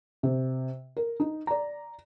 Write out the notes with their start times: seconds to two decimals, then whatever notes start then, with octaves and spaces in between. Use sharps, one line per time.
0.23 C3
0.97 A#4
1.20 D#4
1.47 D5 A#5